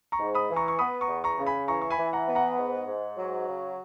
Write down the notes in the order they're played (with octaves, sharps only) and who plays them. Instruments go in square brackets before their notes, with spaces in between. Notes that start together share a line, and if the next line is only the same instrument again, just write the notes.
[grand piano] A#5 C#6
[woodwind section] G#2
[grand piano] B5 D#6
[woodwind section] E3
[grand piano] A#5 C#6
C#6
[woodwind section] B3 [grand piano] B5 D#6
[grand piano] A#5 C#6
[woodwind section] E2
[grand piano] A#5 C#6
[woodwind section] C#3
[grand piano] G#5 B5
[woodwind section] E3 [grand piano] A#5 C#6
[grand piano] C#6
G#5 B5
[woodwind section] E3
[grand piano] F#5 A#5
[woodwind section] B3
[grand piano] F#5 A#5
[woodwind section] G#2
G#2
F#3
C#3